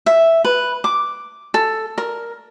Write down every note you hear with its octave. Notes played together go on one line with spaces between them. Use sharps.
E5
B4
D6
A4
A#4